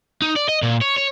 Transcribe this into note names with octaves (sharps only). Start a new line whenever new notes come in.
D#4
D5
D#5
A#2
C#5
C#5